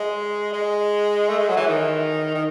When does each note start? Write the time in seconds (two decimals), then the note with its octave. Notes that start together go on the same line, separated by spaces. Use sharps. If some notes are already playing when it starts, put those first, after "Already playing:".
Already playing: G#3
0.53 G#3
1.29 A3
1.38 G#3
1.48 F#3
1.57 E3
1.67 D#3
2.35 D#3